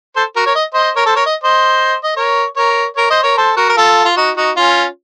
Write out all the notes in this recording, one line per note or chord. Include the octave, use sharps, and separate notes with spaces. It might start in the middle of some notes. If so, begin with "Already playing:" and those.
A4 C5
F#4 A#4
A#4 C#5
D#5
C5 D#5
A#4 C#5
A4 C5
A#4 C#5
D#5
C5 D#5
D#5
A#4 C#5
A#4 C#5
A#4 C#5
C5 D#5
A#4 C#5
A4 C5
F#4 A#4
A#4
F4 A4
F4
D#4 F#4
D#4 F#4
C#4 F4